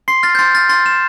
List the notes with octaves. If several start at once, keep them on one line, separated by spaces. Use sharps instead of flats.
C6 C7
F6 A6
G6
C6 A6
F6 A6
C6 A6
F6 E7